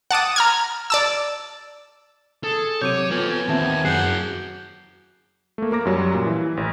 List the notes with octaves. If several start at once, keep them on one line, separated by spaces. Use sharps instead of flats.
F#5 A5 D6 D#6
A#5 F6 G#6
D5 A5 E6
G#4 A4
C3 F#3 C#5 D6 G6 D#7
B3 F4 A4 G#5
D#2 B3 C4 E5 A5
F#2 F#4 G#4 F#5 G6 C7
A3 A#3
A#3 A#4 D6 A#6
F#2 F#3 G3
A#2
E3
A1